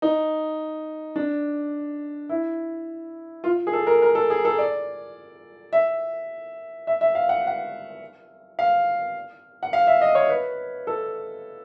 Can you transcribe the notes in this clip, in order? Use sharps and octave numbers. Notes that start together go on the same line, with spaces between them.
D#4
D4
E4
F4
G#4
A4
A#4
A#4
A4
G#4
A4
D5
E5
E5
E5
F5
F#5
F#5
F5
F#5
F5
E5
D#5
C#5
B4
A4